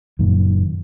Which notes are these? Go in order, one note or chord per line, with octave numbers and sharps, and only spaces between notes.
F#1 F#2 A#2 D#3